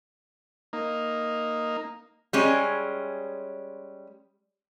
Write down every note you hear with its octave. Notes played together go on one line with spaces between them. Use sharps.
A#3 D#4
G3 G#3 C#4